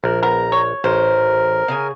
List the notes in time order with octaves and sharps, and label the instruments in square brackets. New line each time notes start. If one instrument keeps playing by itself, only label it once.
[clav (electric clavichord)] A#1 [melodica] A#4
[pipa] B3 A#4 [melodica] A#5
[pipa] C#5
[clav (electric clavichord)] A1 [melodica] A#4 [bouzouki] C5
[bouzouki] C#3 G#4 G#5